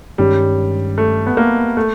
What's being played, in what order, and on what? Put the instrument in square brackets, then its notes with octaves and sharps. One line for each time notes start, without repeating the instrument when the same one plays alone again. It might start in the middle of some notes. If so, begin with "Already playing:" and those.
[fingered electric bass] G2 D#3 G#3 C#4 [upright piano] G3
[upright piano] A3
B3
A#3
A3